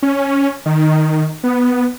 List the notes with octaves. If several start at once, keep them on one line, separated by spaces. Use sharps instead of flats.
C#4
D#3
B3